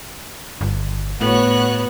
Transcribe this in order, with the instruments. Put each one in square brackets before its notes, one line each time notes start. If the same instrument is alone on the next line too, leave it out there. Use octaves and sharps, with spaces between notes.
[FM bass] G1
[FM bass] A2 [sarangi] B3 [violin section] F#4 C#5 F#6